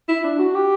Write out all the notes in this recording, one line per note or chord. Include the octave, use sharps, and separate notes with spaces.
E4
D4
F#4
G4